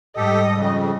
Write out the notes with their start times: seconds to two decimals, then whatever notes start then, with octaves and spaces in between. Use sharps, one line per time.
0.16 G#2 G3 G4 A4 D#5
0.56 F2 C#3